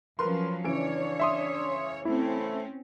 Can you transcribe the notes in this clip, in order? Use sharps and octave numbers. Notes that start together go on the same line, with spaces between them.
F3 F#3 C#4 A#4 B4 C6
C#3 E3 D4 C#5 D7
E5 C6 D#6
A3 C4 C#4 E4